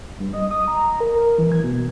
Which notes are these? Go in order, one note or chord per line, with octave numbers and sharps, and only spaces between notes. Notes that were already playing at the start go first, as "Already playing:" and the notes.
G2
D#5
D#6
A#5
A#4
E3
G#6
B2